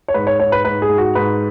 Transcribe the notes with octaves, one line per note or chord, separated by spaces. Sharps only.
C#5
G#2 B4
C#5
G#2 C#5
B4
G#2 B4
G#4
G#2
F#4
G#2 B4